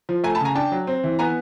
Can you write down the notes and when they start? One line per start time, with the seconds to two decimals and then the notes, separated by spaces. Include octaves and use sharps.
0.09 F3
0.24 A3 G#5 A#5
0.35 A5 B5
0.41 C#3 G#5 A#5
0.55 D4 G5 A5
0.72 F#3
0.87 C4
1.04 E3
1.19 B3 G#5 A#5